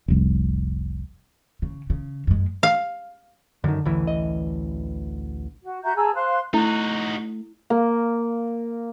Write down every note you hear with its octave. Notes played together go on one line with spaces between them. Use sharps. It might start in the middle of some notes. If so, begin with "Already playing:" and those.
F1 C2
C#3
C#3
F#2 G#3
F5
F#2 D3 D#3
A1 D2 E3
D#5
F#4
F#4 E5 A#5 G6
G#4 A5 A#5 E6
C5 F5 C6 F#6
A3 D#4 E4 F#4
A#3